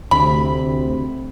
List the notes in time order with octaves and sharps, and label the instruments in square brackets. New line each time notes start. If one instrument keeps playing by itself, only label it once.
[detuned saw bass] D2 [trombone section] C3 C4 [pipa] B5